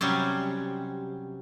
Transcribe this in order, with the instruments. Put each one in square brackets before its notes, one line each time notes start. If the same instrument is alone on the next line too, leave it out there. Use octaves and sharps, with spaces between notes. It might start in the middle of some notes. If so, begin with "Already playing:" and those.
[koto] C3 F#3 G3 C#4